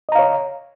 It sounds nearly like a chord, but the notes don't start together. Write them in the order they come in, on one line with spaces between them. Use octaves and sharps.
D#5 A#5 F5 C#5